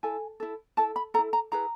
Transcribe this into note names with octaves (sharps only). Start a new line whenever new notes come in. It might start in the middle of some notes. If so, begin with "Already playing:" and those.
E4 A4 G#5
E4 A4
E4 A4 A5
B5
E4 A4 A#5
A#5
E4 G#4 B4 A#5